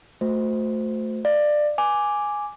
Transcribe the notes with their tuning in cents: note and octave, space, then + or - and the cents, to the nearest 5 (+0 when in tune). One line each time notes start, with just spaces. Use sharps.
A3 +5 F#4 -35 C5 -15
D5 +20 F5 -30
G#5 +0 D6 +0